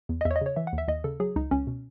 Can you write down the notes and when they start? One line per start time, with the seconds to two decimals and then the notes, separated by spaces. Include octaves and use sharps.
0.09 E2
0.21 D#5
0.25 E2 E5
0.31 C#5
0.36 D#5
0.41 C#3 C#5
0.56 E3 E5
0.67 F#5
0.73 D#2
0.78 E5
0.88 D#2 D#5
1.04 C#3 A4
1.20 F#3 G#4
1.36 C#2 D#4
1.51 C#2 C#4
1.67 B2